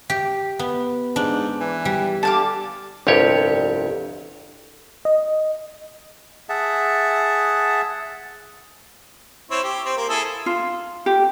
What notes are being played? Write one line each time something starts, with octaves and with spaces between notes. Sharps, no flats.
G4
B3
G#2 D4
E3
G3
D3 G4 F5 A5
G1 C2 F2 G4 C#5
D#5
G#4 E5 F#5 A5
C4 E4 C#5
G4
C4
A#3
E4 G#4 A4
F4
G4